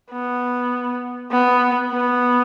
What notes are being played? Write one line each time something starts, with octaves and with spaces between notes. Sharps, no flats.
B3
B3
B3